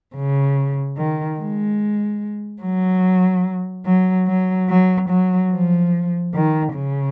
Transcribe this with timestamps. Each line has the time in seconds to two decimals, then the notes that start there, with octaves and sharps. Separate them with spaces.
0.16 C#3
0.97 D#3
1.39 G#3
2.62 F#3
3.85 F#3
4.27 F#3
4.69 F#3
5.09 F#3
5.51 F3
6.34 D#3
6.74 C#3